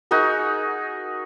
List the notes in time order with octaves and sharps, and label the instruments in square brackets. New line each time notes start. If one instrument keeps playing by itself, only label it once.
[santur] D#4 F#4 G#4 A#4